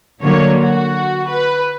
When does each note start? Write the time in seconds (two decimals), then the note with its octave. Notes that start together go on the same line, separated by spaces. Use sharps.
0.22 D3 F#3 A#3 C#5
0.62 F#4
1.29 B4